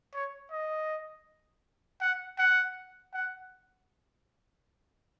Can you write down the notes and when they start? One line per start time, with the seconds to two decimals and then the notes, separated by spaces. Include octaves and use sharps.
0.14 C#5
0.51 D#5
2.01 F#5
2.39 F#5
3.14 F#5